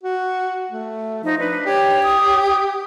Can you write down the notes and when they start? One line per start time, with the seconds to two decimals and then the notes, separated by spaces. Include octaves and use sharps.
0.03 F#4
0.71 A3
1.24 F3 D#4
1.39 D4 B4
1.66 G4 C#5
2.03 D#6